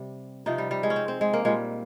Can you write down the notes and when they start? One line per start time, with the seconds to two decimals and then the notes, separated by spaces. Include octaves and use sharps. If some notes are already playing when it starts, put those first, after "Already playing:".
Already playing: C3 G3
0.46 C3 F3 D#4
0.58 G3
0.71 G3
0.83 G#3
0.90 C#4
0.96 C4
1.08 C4
1.21 G#3
1.33 A#3
1.45 A#2 G3 G#3